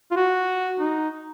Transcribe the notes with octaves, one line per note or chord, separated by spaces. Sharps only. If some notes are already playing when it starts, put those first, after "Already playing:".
F4
F#4
D#4